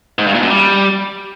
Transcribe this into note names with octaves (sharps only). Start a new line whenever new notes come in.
G#2
G2
A#2
F#2
G3